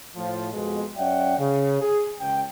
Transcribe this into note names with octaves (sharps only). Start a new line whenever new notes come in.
A2 F3
F2 B2 G#3
F#2 C#4 D5 E5 F#5 G5
C#3
G#4
C#2 G5